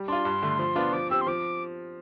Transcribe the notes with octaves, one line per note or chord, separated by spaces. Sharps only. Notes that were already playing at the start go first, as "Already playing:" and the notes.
Already playing: G3
D4 F4 C6
G2
D3 A3
F3
B3 D4 F4
F3 D6
C4 G4 E6
C6
F3 D6